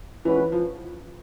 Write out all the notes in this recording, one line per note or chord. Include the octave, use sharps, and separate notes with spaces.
E3 G#3 C#4 F#4 B4
E3
F3